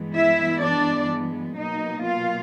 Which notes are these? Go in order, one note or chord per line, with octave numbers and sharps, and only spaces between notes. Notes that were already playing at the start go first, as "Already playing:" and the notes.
Already playing: G2 E3 G#3 B3
E4 E5
D4 D5
B2 F#3 A#3 D#4 D#5
F4 F5